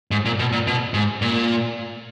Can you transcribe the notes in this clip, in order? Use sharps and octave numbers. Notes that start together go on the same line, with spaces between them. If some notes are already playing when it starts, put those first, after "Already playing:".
G#2
A#2
B2
A#2
B2
G#2
A#2